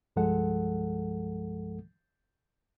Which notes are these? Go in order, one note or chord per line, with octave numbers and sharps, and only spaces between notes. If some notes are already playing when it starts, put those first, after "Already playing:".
C2 G2 F3 G#3 A4 F#5